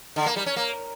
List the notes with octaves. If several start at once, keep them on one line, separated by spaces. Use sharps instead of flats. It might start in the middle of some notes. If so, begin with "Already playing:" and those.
D3
A#3
G3
C#4
A#3